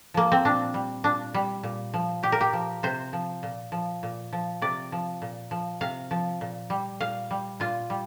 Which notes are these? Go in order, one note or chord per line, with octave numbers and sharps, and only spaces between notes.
F3 A#3
C4
A#2 D4
G3
A#2 D4
G3
A#2
F3
A#2 G4
A#4
G4
F3
C3 C5
F3
A#2
F3
A#2
F3
C3 D5
F3
A#2
F3
C3 F5
F3
A#2
G3
A#2 F5
G3
A#2 F4
G3